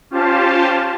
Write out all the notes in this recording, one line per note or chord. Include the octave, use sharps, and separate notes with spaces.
C#4 F4 G4 C5 F5 A5